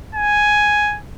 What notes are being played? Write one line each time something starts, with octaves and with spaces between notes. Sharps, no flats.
G#5